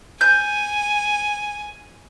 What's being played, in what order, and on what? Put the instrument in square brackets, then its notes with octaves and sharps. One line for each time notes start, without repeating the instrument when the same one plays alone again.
[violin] G#5 [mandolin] G6